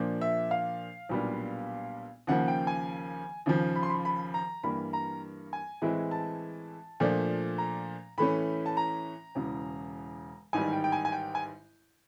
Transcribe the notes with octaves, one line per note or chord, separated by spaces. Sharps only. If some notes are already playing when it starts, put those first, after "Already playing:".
Already playing: A#2 F3 A#3 D4
E5
F5
B1 A#2 G3 B3 D4
D#2 C#3 F3 A#3 F#5
G5
G#5
D#2 C#3 F3
B5
C6
B5
B5
A#5
G2 E3 G3 A#3 B5
A#5
G#5
A2 E3 G#3 C4 E4
A5
A#2 F3 A3 D4
A#5
A2 E3 A3 C#4 B5
A5
A#5
E1 E2 C#3
A1 G#2 D#3 G3 G#5
G5
G5
G#5
G#5
G5
G#5